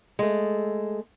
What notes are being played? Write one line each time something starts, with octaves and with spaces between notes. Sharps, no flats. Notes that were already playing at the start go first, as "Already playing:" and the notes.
G#3 A3